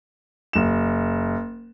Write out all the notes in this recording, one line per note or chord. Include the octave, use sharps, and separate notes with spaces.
F#1 E7